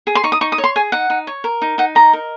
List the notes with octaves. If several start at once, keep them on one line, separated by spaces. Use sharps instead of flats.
G#4
C6
D#4 C#6
D#6
D#4 C#6
D#6
C#5
C6
G#4 G#5
D#4 F#5
D#4
C#5
A#4
D#4
D#4 F#5
D#5 A#5
A#4